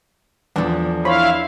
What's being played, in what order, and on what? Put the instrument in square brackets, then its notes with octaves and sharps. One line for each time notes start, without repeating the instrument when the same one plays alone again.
[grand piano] E2 F3 [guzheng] D4 A4
[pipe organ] E4 F5 [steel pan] C5 C#5 B5